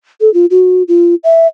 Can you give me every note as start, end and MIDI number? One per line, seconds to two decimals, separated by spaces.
0.21 0.32 69
0.34 0.46 65
0.51 0.83 66
0.88 1.15 65
1.24 1.47 76